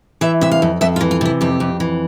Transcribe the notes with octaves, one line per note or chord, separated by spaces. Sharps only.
E3 E5
C3 E5
F5
F2
F2 E5
F4
E3
F4
C3 E4
F2 G4
F2
E3